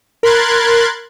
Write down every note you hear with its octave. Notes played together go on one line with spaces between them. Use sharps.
A#4 B5 C6 F#6 G#6 A6